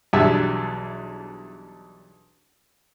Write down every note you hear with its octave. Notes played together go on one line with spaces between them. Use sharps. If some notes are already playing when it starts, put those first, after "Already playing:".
B1 E2 G3 D4 E5